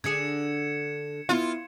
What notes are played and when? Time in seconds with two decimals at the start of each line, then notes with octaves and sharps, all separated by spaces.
0.04 D3 D4 G#4 G#6 C#7 E7
1.29 B3 E4 F4